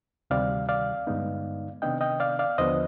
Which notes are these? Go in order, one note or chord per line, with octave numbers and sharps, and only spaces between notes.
D2 C3 D#3 G3 D5 F5
D5 F5
G2 D3 G#3 B3 D#4
C3 D#3 B3 D4 D#5 G5
D#5 G5
D5 F5
D5 F5
D#2 D3 F3 B3 D4 C5 D#5